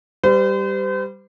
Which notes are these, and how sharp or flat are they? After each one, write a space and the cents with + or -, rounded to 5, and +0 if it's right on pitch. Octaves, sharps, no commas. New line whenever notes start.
G3 +0 C5 -40